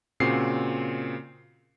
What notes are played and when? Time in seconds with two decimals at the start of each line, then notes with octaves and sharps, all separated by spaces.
0.20 A#2 C#3 C4 F#4 C7